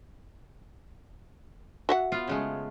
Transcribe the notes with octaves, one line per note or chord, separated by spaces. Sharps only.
F#4 E5 F#5
B3 F4 F5
C#3 G#3 A3